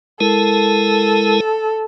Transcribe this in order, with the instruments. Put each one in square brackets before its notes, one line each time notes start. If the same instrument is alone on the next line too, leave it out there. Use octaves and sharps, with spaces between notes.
[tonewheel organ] G#3 E4 A#4 [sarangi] A4